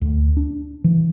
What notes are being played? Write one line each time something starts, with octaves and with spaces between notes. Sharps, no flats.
D2
D4
E3